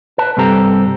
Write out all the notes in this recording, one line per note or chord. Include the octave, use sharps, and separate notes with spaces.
B4 A5
C2 G2 C4 G4 A4 A#5